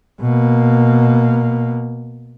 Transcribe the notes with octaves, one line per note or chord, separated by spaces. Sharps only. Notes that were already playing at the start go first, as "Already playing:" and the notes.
B2 A#3